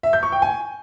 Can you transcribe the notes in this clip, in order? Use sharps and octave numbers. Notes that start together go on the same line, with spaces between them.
E5
G6
C#6
G5
G#5